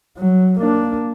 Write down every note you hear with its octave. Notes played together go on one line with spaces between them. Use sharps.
F#3
A#3 D4